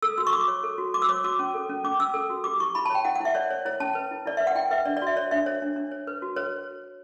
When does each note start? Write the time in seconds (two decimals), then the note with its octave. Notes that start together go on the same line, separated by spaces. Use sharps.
0.02 A4 E6
0.18 F#4 E6
0.27 C#6
0.33 F#4 D6
0.48 C#5
0.64 A4
0.78 F#4
0.94 F#4 D6
1.02 E6
1.09 C#5 D6
1.24 F#4 D6
1.39 C#4
1.54 A4
1.69 C#4
1.84 C#4 D6
1.99 C#4 E6
2.14 A4
2.30 F#4
2.44 G4 D6
2.60 E4 C#6
2.75 E4 B5
2.85 A5
2.90 C#5
2.95 G5
3.05 E4 F#5
3.15 F#5
3.20 E4 E5
3.35 C#5 D5
3.50 C#5
3.65 E4 C#5
3.80 C#4 A5
3.95 B4
4.11 E4
4.26 E4 D5
4.37 B4 E5
4.47 F#5
4.55 E4 G5
4.71 B4 E5
4.85 D4 D5
4.97 D5
5.02 F#4 E5
5.16 C#5 D5
5.31 D4 E5
5.46 C#5
5.62 D4
5.76 D4
5.91 C#5
6.07 B4
6.22 F#4
6.36 B4 C#5